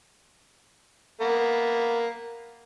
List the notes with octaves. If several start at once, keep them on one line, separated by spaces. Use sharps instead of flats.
A#3 B3